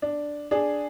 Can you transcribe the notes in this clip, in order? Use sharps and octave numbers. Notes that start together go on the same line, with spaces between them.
D4
D4 G#4